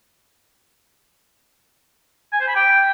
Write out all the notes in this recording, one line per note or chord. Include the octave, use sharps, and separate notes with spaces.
G#5
C5
B5
G5